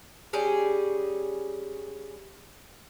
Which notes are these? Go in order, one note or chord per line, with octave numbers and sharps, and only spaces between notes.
G3 C#4 G#4